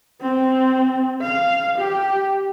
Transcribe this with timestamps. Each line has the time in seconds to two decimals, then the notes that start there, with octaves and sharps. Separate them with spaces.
0.21 C4
1.22 F5
1.78 G4